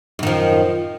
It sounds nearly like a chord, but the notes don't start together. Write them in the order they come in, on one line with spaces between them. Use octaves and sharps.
F#2 D#3 F3